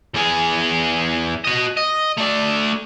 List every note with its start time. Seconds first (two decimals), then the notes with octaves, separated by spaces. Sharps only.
0.14 E2 G#4
1.44 F#4 D#5
1.77 D#5
2.17 A3 D5